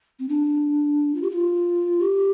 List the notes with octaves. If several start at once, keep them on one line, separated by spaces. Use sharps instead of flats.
C4
D4
F4
G4
F4
G4